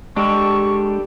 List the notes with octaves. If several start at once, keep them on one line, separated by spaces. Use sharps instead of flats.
G3 G#3 D4 G4 A4 C#6